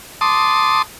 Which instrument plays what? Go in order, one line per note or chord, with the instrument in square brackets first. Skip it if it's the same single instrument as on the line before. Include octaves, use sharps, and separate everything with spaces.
[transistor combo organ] A5 C6 D6 D#6